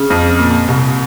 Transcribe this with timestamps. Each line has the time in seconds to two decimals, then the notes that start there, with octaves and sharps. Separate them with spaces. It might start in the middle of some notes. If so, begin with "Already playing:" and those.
Already playing: C#3
0.10 F2
0.39 A#2
0.68 C2